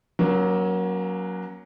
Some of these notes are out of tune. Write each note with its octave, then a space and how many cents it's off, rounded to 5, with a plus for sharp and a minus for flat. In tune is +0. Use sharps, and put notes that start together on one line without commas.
F#3 +0 A#3 +25 C#4 +5